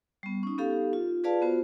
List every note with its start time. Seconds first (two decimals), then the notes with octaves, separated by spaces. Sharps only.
0.23 G3 B3
0.43 C#4 D#4
0.58 B3 D#4 G4 A4 F5
0.93 F4
1.24 F4 G#4 B4 D5 F5 A5
1.42 B3 F4 F#4 C5